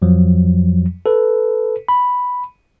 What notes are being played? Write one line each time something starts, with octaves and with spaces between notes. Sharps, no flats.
F2 F3 F#3
A4 B4
B5